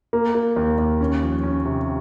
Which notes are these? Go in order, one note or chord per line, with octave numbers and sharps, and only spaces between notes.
A#3
A#3
D#2
D#2
C#4
F3
C#4
C3